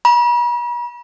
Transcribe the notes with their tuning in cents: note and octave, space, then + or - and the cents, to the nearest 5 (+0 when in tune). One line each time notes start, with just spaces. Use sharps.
B5 -45